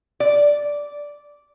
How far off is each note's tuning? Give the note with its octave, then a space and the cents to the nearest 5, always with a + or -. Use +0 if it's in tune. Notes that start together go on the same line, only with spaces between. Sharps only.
D5 -10